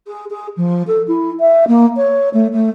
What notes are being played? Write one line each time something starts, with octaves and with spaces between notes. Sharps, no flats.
G#4
G#4
F3
A4
E4
E5
A#3
C#5
A3
A3